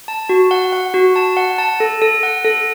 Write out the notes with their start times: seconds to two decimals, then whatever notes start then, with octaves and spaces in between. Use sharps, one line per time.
0.08 A5
0.29 F#4
0.51 F#5
0.73 F#5
0.94 F#4
1.16 A5
1.37 F#5
1.58 A5
1.80 A4
2.02 A4
2.23 F#5
2.45 A4